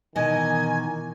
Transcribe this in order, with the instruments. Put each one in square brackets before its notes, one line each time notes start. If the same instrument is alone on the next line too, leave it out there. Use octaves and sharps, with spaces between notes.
[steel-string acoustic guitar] B2 E3 D#5 [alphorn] D#3 [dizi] G#5